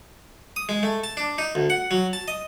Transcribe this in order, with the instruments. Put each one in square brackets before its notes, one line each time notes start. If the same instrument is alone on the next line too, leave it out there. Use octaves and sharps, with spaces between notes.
[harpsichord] D#6
G#3
A3
A5
D4
D#4
D2
F#5
F#3
A5
D#5